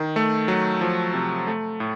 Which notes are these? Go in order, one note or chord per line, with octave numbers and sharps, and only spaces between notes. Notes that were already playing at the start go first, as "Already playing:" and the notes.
Already playing: D#3
A3
F#3
F3
C3
A3
A2